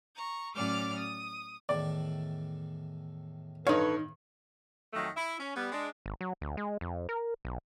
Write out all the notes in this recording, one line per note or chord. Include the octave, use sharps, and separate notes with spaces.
A#5 C#6
A2 F#3 C#4 D5 D6 F6
D#6
E2 A2 D#3 D5
G2 D#4 A4 B4 C#5 F5
F2 D#3 F#3 A3
E4
C#4
G3 B3
G#3 D4
G#1
F#3
D2
G#3
F2
A#4
B1